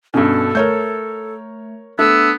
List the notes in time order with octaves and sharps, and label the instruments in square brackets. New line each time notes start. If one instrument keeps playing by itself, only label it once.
[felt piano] G2 B2 [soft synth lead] C#4 [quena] A4
[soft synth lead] A3 [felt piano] A#4 C#5 G6
[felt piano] A3 [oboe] B3 [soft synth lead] D4 [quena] E6